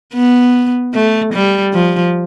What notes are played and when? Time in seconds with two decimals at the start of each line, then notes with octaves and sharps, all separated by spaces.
0.14 B3
0.95 A3
1.33 G3
1.73 F3